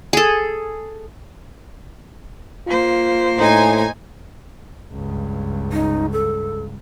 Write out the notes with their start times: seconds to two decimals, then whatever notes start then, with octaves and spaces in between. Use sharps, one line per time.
0.13 G#4 A4
2.68 A#3 F4 C5
3.39 A2 D#4 G#5
4.92 C#2 G2
5.73 D#4
6.12 A4